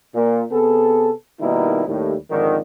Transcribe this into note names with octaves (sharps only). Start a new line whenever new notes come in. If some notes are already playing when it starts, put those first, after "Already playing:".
A#2
C3 B3 G#4 A4
B2 D#3 G3 A#3 D#4 E4
D#2 A2 G3
F2 G#2 D3 D#3